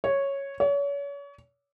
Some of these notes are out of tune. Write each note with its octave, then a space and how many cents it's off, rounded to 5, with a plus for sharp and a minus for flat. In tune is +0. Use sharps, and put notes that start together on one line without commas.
C#5 -5
C#5 +35